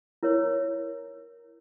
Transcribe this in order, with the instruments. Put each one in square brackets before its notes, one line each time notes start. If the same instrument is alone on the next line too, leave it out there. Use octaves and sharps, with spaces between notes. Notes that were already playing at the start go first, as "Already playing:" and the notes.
[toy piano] E4 A#4 C#5